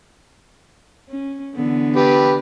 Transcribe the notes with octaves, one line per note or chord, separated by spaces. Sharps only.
C#4
D3 E3 B3
G4 B4